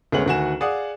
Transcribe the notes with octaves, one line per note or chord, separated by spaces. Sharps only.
D2 G#3 B3 C#4 F#5 F#7
D2 D#3 F#4 F#5 G#5 E7
G#4 D5 F5 F#5 D#6